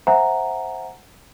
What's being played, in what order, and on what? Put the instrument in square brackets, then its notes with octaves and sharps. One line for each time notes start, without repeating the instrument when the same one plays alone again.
[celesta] C5 E5 F#5 G#5 A#5